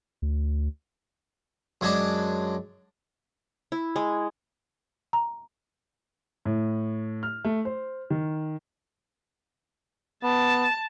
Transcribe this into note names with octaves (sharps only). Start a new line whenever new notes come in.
D2
F#2 G#3 D4
E4
G#3
A#5
A2
F6
A3
C5
D#3
B3 A5